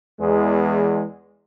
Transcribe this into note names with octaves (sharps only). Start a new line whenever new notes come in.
E2 G#3